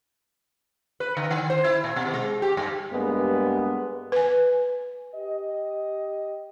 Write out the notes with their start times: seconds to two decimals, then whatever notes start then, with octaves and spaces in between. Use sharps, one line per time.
1.00 B4
1.17 D3
1.31 D#3
1.50 C5
1.64 E4
1.84 A#2
1.96 B2
2.14 G#3
2.42 G4
2.57 G2
2.92 G2 G3 G#3 A#3 B3
4.12 B4 G#5
5.15 G4 D#5